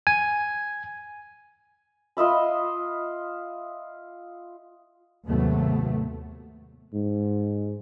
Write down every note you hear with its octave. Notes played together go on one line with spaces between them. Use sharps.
G#5
F4 D#5 E5 B5
D#2 G#2 C3 F#3 A3 B3
G#2